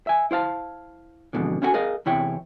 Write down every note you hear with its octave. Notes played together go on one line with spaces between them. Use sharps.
E5 G#5
E4 C5 F5 A5
F2 G#2 B2 D3 E3
C#4 D4 E4 F#4 A4 G#5
G#4 A#4 D#5 F5
E2 C3 E4 C#5 G5